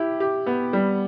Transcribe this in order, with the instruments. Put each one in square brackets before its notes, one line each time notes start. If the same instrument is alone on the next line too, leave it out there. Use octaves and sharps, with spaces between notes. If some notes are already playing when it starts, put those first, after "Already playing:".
Already playing: [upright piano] E4 G4
G4
B3
G3